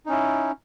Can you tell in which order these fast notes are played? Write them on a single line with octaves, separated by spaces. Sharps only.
D#4 C#4 E4